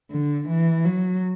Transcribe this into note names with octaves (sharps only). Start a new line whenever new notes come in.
D3
E3
F#3